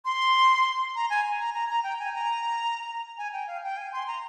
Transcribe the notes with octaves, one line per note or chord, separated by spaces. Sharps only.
C6
A#5
G#5
A#5
A#5
A#5
G5
G#5
A#5
G#5
G5
F5
G5
G#5
C6
A#5